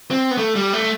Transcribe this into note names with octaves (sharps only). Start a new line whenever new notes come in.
C4
B3
A3
G3
A3